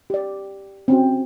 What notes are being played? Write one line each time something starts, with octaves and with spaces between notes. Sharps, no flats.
G4 D5
C4 C#4 F#4